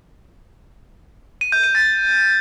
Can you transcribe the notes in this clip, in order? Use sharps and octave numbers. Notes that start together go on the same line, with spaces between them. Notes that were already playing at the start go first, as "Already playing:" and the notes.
D#7
G6
D#7
A6